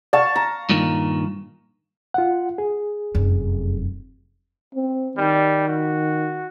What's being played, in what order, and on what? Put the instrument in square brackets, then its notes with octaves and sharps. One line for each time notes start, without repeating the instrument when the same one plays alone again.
[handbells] D5 F#5 [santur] F5 A5 C#6
[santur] A#5
[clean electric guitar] G2 A#2 D#3
[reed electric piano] F4 F#5
G#4
[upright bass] F1 F#2
[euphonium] C4
[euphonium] D#3 [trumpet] G3
[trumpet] F#4